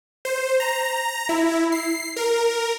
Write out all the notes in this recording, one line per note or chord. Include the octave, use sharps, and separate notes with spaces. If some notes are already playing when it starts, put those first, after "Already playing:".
C5
A#5
E4
C7
A#4